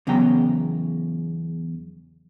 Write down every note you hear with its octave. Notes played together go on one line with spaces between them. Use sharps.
E2 C#3 F#3 B3 G5 A#5